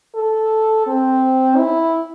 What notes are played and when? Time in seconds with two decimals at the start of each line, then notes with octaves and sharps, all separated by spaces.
0.15 A4
0.87 C4
1.57 E4